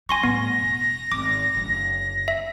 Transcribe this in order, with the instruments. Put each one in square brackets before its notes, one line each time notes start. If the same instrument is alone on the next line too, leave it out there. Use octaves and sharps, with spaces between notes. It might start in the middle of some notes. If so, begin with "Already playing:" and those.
[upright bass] G3 [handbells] G#5 C6 C#6 [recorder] A#6
[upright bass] A2 G3 [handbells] B3
[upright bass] E1
[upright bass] G#1 [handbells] D6
[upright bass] F#1 D3
[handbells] E5